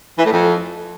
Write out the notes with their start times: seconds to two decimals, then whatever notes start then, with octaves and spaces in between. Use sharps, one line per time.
0.18 E3
0.25 A2
0.32 F2